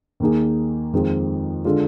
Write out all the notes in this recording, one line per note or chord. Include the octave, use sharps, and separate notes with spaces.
D#2 D#3 A#3 D#4 G#4
F2 D#3 G#3 C4 F4
D3 G#3 D4 F4